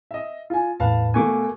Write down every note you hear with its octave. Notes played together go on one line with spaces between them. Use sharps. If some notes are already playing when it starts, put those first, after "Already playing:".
D#5 E5
F4 G#5
E2 A2 B4 F5 A5
B2 A3 A#3 G#5 C#6 D6